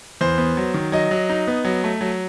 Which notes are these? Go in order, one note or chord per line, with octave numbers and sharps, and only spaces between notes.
E2 C5
B3
F#3
D#3
F#3 D#5
F#3
D#4
B3
F#3
A3
F#3